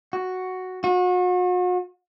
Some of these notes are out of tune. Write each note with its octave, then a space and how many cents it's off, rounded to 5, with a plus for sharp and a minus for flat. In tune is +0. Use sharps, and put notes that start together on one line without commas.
F#4 +0
F#4 -40